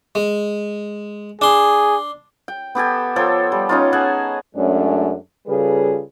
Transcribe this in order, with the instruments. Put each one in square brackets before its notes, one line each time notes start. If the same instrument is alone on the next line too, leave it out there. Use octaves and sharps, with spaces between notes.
[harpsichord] G#3
[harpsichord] D4 C6 [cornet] G#4
[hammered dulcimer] G5
B3 G4 A4 G#5
F3 A4 C#5 G5
G3
C#4 D#4 F4
G#4 F#5 G#5 A5
[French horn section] F#2 G#3 A3 C#4 D4
C#3 G3 F4 G#4 A4 B4